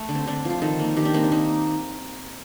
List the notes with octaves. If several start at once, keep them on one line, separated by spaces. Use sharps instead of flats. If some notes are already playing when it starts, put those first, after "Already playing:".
Already playing: A3
D3
C4
D3 D4
F3 F4
D#3 A4
A#3
D#3 G4
D4
A#3 C4
D4
A#3 D#4